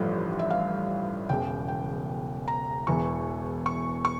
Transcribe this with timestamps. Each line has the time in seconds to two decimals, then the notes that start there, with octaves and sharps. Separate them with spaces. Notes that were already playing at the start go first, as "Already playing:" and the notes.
Already playing: A1 G2 F3 A4
0.39 E5
0.50 F5
1.29 E1 E2 C#3 G5
1.68 G5
2.48 A#5
2.87 E1 E2 E3 C#6
3.66 C#6
4.05 C#6